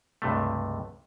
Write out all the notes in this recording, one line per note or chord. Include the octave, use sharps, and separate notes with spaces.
C#2 G2 C3 A3